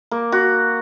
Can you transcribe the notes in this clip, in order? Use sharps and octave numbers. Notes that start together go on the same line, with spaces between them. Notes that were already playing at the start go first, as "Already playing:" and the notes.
A#3
F#4